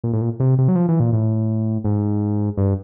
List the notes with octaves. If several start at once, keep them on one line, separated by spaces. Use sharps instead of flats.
A#2
A2
A#2
C3
C3
F#3
F3
E3
A#2
A2
G#2
G2